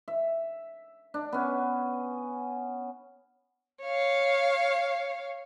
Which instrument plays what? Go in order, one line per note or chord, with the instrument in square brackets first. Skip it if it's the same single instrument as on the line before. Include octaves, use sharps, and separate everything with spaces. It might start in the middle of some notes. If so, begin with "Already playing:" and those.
[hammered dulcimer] E5
D4
B3 C#4
[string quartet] C#5 F5